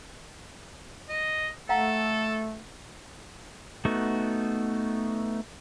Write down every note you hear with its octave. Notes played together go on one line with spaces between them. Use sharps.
D#5
A3 A4 F5 F#5 A#5
A3 B3 D#4 F#4